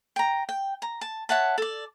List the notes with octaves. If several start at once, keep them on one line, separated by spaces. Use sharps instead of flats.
G5 A#5
G5
A#5
A5
C#5 E5 F#5 A5
A4 D5